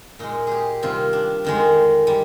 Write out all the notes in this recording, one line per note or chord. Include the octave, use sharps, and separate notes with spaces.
A#2 G#3 D#4
G4 G#4
C3 D#3 G3 F4
D4
F2 D#3 G#3
G3